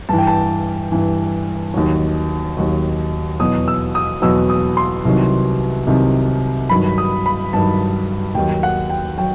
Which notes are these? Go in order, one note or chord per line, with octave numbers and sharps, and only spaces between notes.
G2 E3 A5
G5
A5
G2 E3
D#2 D#3 F#3
D#2 D#3 F#3
E2 B2 F#3 D#6
E6
D#6
E2 B2 F#3 E6
D#6
C6
C2 C3 D#3 F#3
C2 C3 D#3 F#3
G2 D#3 F#3 B5
D#6
B5
G2 D#3 F#3 A5
D#2 D#3 F#3 G5
F#5
G5
F#3 G5